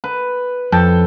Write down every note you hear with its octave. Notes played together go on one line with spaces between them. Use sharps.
B4
F2 A4 G5 A5